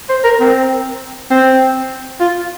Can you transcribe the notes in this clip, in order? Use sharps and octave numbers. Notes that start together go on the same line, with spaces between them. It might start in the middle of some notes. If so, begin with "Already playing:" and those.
C5
A#4
C4
C4
F4